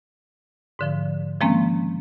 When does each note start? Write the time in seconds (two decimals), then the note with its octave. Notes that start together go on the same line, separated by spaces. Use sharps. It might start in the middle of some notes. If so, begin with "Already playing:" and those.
0.79 G#2 D3 F3
1.41 D#3 F3 G#3 A#3 C4 C#4